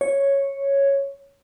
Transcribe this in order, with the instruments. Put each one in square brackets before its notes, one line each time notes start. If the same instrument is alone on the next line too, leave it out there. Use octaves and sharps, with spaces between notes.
[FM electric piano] C#5